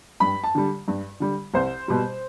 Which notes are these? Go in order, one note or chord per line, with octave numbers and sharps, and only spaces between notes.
G2 B5
A5
D3 G3
G2
D3 G3
C2 C5
B2 G3